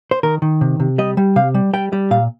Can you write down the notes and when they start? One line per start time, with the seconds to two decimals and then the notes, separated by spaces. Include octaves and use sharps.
0.11 C5
0.23 D#3 A#4
0.42 D#3
0.61 C3
0.80 C3
0.98 G3 D#5
1.17 G3
1.36 C3 F5
1.54 G3
1.73 G3 G5
1.93 G3
2.11 A#2 F5